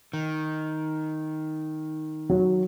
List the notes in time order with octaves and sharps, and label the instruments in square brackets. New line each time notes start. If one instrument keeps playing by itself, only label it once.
[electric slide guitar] D#3
[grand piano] F#3